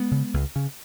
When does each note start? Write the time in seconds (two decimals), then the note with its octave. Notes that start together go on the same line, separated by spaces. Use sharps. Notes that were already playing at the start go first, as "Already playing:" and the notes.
Already playing: G#3 B3
0.11 C#3
0.34 C#2
0.56 C#3